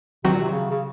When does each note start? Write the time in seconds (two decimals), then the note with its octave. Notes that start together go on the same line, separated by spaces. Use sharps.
0.24 C3 D#3 F#3 C4 F#4
0.33 A#2
0.40 C3
0.52 C#3
0.70 C#3